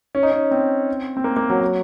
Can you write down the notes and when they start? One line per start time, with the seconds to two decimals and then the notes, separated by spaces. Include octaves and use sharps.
0.15 C#4
0.23 D#4
0.32 C#4
0.51 C4
1.17 C4
1.24 A#3
1.36 A#3
1.50 F#3
1.61 F#3